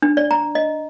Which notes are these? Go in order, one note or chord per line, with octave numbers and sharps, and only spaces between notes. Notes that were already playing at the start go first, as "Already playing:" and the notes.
D4
D5
A#5
D#5